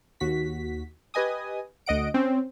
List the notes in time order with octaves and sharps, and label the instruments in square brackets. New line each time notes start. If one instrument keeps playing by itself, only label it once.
[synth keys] D#2 F#4 B6
G4 B4 D#5 G#5 D#6
D2 D#5 F#5 D7
C4 C#4